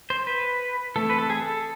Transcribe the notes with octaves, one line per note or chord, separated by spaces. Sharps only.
C5
B4
E3 A3 C4 A4
B4
A4
G#4
A4